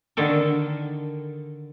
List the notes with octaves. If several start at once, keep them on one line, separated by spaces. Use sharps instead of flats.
D3 D#3 A4 A#4